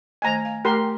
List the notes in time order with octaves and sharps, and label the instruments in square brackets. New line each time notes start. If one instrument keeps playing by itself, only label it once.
[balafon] D#3 A3 D#5 [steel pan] G#5 A#5
[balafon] F5
[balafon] A3 F#5 [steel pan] G4 A#4 C6